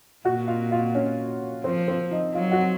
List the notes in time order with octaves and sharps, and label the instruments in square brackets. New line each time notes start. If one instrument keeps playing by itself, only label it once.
[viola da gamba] A#2 [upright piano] F#4 F#5
[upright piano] F4 F5
F4 F5
C#4 C#5
[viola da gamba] F3 [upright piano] C4 C5
[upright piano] C4 C5
D#4 D#5
[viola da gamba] F#3 [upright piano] F4 F5
[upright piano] F#4 F#5